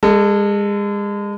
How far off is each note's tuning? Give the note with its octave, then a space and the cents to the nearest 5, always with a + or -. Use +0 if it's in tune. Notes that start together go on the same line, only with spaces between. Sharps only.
G#3 -30 A4 +10